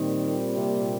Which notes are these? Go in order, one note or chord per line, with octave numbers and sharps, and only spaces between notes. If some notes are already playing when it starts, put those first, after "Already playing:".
Already playing: A#2 D#3 G3 C4
C3